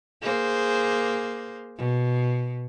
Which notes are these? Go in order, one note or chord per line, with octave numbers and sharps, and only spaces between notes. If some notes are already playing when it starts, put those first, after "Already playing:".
A#3 G#4 C5
B2